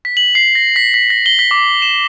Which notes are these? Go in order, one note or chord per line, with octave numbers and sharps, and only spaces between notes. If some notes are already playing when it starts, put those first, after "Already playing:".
B6
F#7
C7
A#6
B6
B6
A#6
G7
B6
D6
E7